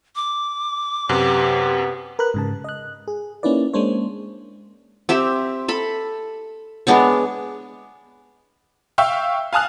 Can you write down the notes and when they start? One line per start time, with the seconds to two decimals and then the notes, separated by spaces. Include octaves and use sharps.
0.16 D6
1.09 F#2 C3 B3 G4
2.19 A#4 B4 B5 F#6
2.34 G#2 C#3 A5
2.64 D#5 F#6
3.08 G#4
3.43 A#3 C#4 D#4 E4 B4 D5
3.73 G#3 A#3 C#4 D4 C5 C#5
5.09 C4 G4 E5
5.68 A4 B5
6.87 G#3 B3 D4 C#5
8.98 E5 F5 G5 C#6 E6
9.53 F5 G#5 A5 D#6 F6 F#6